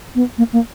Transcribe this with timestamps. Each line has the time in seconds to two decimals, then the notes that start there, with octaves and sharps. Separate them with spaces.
0.15 B3
0.38 A#3
0.53 A#3